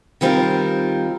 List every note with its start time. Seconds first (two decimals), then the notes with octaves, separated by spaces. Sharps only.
0.21 D#3 G3 C4 F4 A#4